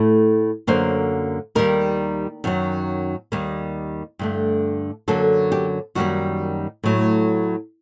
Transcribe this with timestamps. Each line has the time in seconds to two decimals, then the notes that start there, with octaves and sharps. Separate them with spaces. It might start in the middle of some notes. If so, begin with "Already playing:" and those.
Already playing: A2 A3
0.67 F#2 D3 F#3 A#3 C5
1.55 D#2 D#3 G3 A#3 A#4
2.44 F#2 D#3 F#3
3.32 D#2 D#3 G3 A#3
4.19 G2 D3 A3
5.08 F#2 D3 F#3 A#3 A4
5.52 G4
5.95 F#2 D#3 G3 A#3 F#4
6.84 A2 F#3 A3